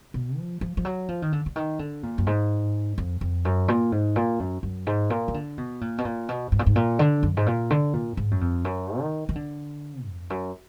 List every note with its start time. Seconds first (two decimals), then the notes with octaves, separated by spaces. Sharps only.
0.14 B2
0.38 F3
0.61 F3
0.77 F3
0.85 F#3
1.09 F3
1.22 D#3
1.33 D3
1.46 D3
1.56 D#3
1.79 D3
2.03 A#2
2.18 F#2
2.27 G#2
2.98 F2
3.21 F2
3.45 F#2
3.68 A#2
3.92 G#2
4.16 A#2
4.40 F#2
4.63 F#2
4.87 G#2
5.10 A#2
5.28 D#3
5.34 D3
5.58 B2
5.81 A#2
5.98 B2
6.05 A#2
6.29 B2
6.52 G#2
6.59 A#2
6.66 G#2
6.76 A#2
6.99 D3
7.23 F#2
7.37 G#2
7.47 A#2
7.70 D3
7.93 A#2
8.17 G#2
8.31 F#2
8.41 F2
8.65 F#2
9.00 D#3
9.29 D#3
9.36 D3
10.06 F2
10.30 F#2